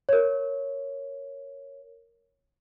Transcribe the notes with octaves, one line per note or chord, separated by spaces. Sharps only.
A#4 C#5